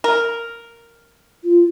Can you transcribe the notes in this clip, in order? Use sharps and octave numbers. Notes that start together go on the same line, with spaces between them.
A#4
F4